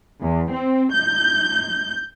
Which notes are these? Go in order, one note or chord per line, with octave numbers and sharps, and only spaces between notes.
E2
C4
G6